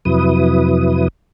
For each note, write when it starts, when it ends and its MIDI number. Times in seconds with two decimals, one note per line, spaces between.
0.05 1.08 41
0.05 1.08 48
0.05 1.08 54
0.05 1.08 64
0.05 1.08 71
0.05 1.08 87